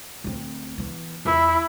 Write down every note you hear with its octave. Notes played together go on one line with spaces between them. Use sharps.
D1 C4
E3 B3
E2 E4